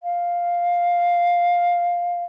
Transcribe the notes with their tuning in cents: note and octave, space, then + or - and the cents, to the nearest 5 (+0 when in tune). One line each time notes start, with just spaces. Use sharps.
F5 +5